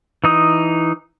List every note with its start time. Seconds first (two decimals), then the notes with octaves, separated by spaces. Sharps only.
0.24 E3 D#4 D#6